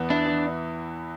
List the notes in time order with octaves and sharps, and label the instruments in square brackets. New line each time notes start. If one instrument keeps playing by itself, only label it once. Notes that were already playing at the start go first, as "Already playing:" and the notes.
Already playing: [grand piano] E2 E3 B3
[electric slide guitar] D4 [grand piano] E4
[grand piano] E3